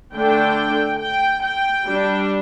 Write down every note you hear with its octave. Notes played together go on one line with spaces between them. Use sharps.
D3 A3 D4 G5
G5
G5
G3 D4